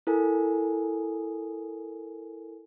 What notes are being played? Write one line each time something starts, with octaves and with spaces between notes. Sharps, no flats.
E4 A4 A#4 G#5